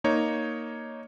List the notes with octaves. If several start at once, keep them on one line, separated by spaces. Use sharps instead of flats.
A#3 D#4 C#5